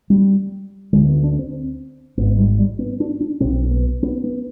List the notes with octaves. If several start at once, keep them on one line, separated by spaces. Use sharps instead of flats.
G3
D2 D3 G#3
B3
D4
C4
G#1 G#2 B3
G3
G3
B3
D4
D4
B1 B2 C4
B3
B3
B3